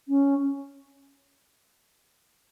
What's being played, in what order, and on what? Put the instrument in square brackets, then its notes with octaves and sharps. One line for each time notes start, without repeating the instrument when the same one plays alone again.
[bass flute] C#4